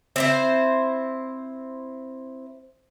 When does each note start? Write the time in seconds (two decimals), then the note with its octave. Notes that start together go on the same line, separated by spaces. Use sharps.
0.16 C4 E4 C5